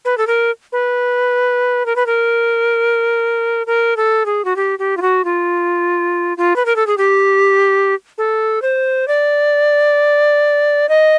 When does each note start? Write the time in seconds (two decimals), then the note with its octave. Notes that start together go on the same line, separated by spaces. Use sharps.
0.05 B4
0.18 A4
0.27 A#4
0.72 B4
1.86 A#4
1.96 B4
2.06 A#4
3.67 A#4
3.97 A4
4.26 G#4
4.45 F#4
4.56 G4
4.79 G4
4.97 F4
5.02 F#4
5.25 F4
6.37 F4
6.56 B4
6.66 A#4
6.76 A4
6.87 G#4
6.98 G4
8.18 A4
8.62 C5
9.08 D5
10.89 D#5